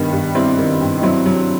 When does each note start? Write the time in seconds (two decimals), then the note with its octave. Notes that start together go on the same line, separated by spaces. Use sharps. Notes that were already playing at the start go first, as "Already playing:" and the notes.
Already playing: G2 D#3 B3 D#4
0.12 G2
0.35 G3 C4 E4
0.58 D#3
0.80 G2
0.99 D#4
1.03 F#3 C4 E4
1.26 F#3